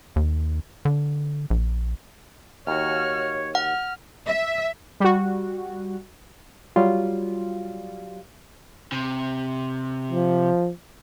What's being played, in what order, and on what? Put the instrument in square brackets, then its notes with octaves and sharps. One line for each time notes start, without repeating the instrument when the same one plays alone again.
[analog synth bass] D#2
D3
A#1
[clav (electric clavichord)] D#2 [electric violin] F#4 F6 [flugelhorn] C#5
[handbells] F#5 [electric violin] F6
[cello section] E5
[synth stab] G3 F#4
[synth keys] F#3 G3 F4
[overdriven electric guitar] C3
[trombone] F3